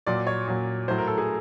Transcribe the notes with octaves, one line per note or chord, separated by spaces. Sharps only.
A#2 F#3 D5
C#5
A#2 F#3
A2 F#3 C5
A#4
A4
G#4